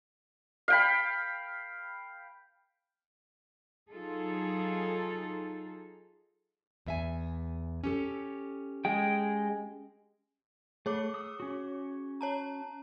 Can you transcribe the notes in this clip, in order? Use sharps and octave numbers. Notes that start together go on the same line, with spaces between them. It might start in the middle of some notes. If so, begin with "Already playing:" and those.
F5 G5 B5
F#3 D#4 F4 G#4 A4
E2 E5 G#5
C#4 G4 A4
G#3 G#4 G5
A3 G#4 C#5 D6
D#6 E6
C#4 F#4
C#5 A5 A#5